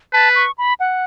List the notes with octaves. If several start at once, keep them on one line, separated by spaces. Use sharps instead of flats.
B4 A5
C#6
B5
F#5